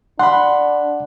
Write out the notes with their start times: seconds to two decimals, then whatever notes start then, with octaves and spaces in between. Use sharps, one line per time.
0.19 D4 F#5 B5 C6